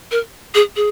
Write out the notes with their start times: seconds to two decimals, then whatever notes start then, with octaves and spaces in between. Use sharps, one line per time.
0.12 A#4
0.55 G#4
0.76 G#4